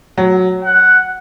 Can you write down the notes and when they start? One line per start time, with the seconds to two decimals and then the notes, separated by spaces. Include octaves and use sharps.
0.18 F#3
0.64 F#5